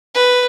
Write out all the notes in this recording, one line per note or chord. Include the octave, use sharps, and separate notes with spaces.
B4